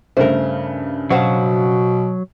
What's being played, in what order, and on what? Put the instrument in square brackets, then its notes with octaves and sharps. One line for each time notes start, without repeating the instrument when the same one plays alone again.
[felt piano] G2 C#3 A3 [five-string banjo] A#4 C5
[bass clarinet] B2 [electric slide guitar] F#3 [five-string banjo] F#4 C5 F5